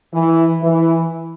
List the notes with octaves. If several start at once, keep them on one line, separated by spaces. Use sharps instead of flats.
E3
E3